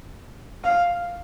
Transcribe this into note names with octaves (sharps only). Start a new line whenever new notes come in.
F5